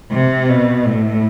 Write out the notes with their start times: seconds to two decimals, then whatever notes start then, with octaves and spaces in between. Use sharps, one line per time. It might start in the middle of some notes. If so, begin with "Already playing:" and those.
0.12 C3
0.49 B2
0.86 A2